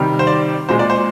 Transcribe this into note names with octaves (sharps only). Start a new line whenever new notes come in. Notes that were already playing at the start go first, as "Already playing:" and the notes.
Already playing: C3 D#3 G3
C5
D5
A#2 G#3 C5
D5
C5